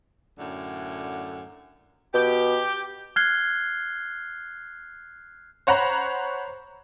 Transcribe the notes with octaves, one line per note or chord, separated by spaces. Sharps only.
F#2 A2 D3
B2 G4
F6 F#6 G#6 C7 G7
C5 C#5 F#5 A#5 B5